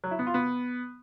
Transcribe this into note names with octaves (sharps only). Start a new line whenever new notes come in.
F#3
E4
B3
F4
B3